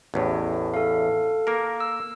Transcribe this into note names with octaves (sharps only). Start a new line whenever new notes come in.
A1 E2 A2
A4 F5
A#3 A#4
E6